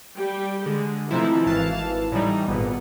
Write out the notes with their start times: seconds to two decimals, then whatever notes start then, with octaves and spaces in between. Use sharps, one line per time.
0.18 G3 G4 G5
0.66 D3 G#3
1.11 C3 E3 F3 A3 D#4 E4
1.46 G#1 E3 F5 A5
2.12 A2 E3 G3 D#4
2.48 G#1 A#2 B3